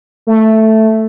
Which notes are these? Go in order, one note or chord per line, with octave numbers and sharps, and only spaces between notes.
A3